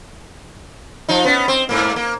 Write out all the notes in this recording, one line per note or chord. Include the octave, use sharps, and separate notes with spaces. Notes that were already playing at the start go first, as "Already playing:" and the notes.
F3 D#4
B3 C#4
C4
G#2 A#3
A#3